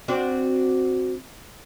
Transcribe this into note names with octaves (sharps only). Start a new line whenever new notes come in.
C4 D4 F#4